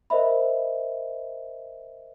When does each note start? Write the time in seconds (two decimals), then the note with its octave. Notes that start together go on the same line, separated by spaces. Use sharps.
0.10 A#4 C5 D#5 E5 B5